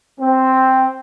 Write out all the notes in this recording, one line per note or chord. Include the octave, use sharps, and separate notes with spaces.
C4